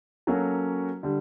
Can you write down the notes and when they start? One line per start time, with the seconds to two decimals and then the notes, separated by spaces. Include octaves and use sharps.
0.27 F#3 A#3 C#4 F#4 A4
1.03 D3 G3